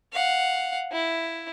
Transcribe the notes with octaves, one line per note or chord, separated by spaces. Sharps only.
F5 F#5
E4